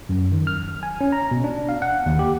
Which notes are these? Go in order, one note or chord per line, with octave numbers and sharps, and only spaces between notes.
F#2
D#3
F6
G#5
C#4
A#5
B2
D4
F5
F#5
D#2
G4